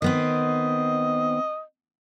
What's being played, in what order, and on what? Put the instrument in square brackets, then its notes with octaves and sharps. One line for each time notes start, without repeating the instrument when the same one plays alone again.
[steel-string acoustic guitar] D#3 B3 C4 [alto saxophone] D#5